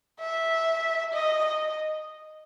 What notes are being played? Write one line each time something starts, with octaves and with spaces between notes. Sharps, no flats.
E5
D#5
D#5